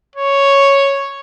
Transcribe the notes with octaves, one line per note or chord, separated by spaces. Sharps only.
C#5